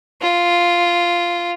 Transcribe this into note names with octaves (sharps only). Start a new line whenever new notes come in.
F4